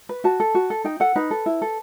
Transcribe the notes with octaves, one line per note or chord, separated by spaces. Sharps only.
B4
F#4 A5
A4
F#4
A4
D#4 G5
A4 F#5
D#4 B4
A4
E4
A4